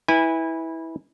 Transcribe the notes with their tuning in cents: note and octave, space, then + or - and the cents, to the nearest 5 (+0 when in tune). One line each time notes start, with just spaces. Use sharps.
E4 -20 B4 +0 G#5 -25